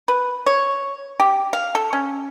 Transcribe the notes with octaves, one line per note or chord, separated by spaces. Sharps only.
B4
C#5
G4
F5
A4
C#4